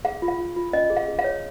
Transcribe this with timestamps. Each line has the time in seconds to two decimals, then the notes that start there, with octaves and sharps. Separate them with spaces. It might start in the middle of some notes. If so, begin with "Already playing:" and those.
0.05 G#4 F5
0.22 F4
0.28 F5
0.39 F4
0.56 F4
0.73 C#4 D#5
0.90 G#4
0.97 F5
1.08 G#4
1.19 F5
1.24 C#5